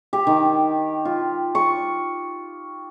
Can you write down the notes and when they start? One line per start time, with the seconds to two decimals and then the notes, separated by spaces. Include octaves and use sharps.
0.13 G4
0.27 D#3
1.05 F4
1.55 C#6